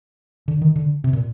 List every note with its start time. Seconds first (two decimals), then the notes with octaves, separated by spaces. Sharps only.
0.48 D3
0.62 D#3
0.76 D3
1.04 C3
1.13 A#2